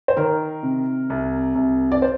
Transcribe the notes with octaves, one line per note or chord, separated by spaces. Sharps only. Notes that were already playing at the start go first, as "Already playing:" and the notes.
C5
D#3 A#4
C3
C2
C2
D5
C5